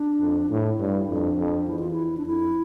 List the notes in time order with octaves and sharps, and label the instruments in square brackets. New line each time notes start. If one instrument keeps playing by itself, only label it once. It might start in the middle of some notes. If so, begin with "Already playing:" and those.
Already playing: [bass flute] D4
[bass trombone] F2
[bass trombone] A2 [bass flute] E4
[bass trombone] G2
[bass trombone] F2 [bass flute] D4
[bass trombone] F2
[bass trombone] E2 [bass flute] E4
[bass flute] F4
E4
D4
[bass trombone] F2 [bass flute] E4